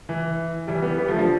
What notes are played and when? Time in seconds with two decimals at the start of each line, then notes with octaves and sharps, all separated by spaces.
0.09 E3
0.67 E3 G3
0.82 G3 B3
0.98 G3 B3
1.08 F3 A3
1.18 D3 F3